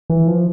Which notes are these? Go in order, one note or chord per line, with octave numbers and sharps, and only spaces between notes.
E3
F3